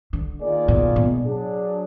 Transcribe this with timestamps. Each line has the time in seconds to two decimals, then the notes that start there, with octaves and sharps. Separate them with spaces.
0.13 D3
0.41 D#3 A#3 F4 G#4 D5
0.68 B2
0.96 B2
1.24 F#3 D4 G#4